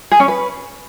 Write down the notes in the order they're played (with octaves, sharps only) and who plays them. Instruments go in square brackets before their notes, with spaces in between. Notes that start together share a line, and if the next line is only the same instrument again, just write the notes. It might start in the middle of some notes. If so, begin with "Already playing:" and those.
[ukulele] G#4
C#4
B4